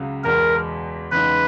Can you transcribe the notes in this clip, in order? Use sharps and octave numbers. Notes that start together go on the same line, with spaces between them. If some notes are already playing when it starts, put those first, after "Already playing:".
Already playing: C#2 C#3 F#3
E2 B2 G#3 A#4
E2 C#3 G#3 B3 D#4 B4